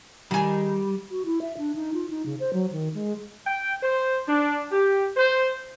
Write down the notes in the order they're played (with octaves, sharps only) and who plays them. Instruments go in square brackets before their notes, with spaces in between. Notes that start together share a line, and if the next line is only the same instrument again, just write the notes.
[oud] D#3 G#4 [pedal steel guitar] G3
[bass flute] F#4
E4
E5
D4
D#4
F4
D#4
C#3
C5
F#3
D#3
G#3
[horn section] G5
C5
D4
G4
C5